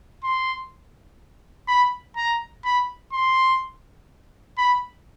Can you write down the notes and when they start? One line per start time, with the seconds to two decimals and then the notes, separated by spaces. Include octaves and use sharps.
0.24 C6
1.68 B5
2.17 A#5
2.65 B5
3.13 C6
4.58 B5